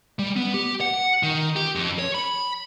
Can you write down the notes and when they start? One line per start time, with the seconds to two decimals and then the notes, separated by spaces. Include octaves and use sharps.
0.19 G3
0.36 B3
0.54 G4
0.81 F#5
1.23 D#3
1.56 G4
1.75 F2
1.99 C#5
2.15 B5